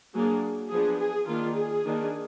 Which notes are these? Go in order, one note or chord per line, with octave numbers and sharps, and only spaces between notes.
F#3 A#3 D4 G#4
F3 B3 D4 G#4
G#4
D#3 A#3 D4 F4
G#4
D#3 A#3 D4